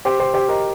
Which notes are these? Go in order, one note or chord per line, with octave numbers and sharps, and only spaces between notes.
G4 C5
G4 C5
G4 C5
A#4 D#5